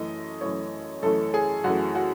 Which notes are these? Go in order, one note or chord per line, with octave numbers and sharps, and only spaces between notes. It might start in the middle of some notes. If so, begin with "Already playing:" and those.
Already playing: F#2 E3 A3 D#5
F#2 E3 A3 C#5
F#2 E3 A3 A4
G#4
F#2 E3 A3 F#4
F#4